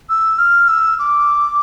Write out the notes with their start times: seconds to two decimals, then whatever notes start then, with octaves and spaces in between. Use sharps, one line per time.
0.09 E6
0.39 F6
0.68 E6
0.99 D6